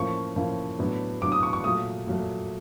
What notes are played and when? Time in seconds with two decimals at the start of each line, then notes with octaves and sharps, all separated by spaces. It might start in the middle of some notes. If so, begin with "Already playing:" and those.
Already playing: A2 F3 A#3 C#4 C#6
0.36 A2 F3 A#3 C#4
0.79 A2 F#3 B3 D4
1.22 A2 F#3 B3 D4 D6
1.32 D#6
1.43 C#6
1.53 C#6
1.64 A#2 F#3 A3 D#6
2.07 A#2 F#3 A3